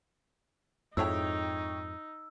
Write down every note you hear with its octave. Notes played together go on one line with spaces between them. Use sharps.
F2 G#2 D#4 E4 C#5 G5 E6